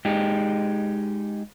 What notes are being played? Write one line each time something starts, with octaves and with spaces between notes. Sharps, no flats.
G#3 D#4 G4